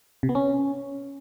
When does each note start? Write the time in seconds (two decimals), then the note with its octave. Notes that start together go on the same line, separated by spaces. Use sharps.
0.23 C3
0.29 B3
0.35 C#4